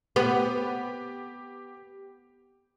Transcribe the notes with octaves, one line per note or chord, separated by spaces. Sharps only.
B3 G4